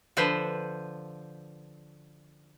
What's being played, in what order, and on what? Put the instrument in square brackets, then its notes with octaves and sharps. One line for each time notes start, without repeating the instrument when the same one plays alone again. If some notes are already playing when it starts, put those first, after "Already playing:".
[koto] D3 F3 B4 C5